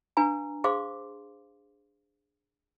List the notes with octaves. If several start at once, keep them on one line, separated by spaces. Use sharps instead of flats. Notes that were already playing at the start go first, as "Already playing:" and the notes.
D4 B4 F5 G#5 A#5
G#4 C5 F5 C6 D6